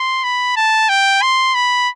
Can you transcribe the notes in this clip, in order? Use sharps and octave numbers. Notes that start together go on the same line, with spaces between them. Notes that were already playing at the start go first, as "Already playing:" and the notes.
Already playing: C6
B5
A5
G5
C6
B5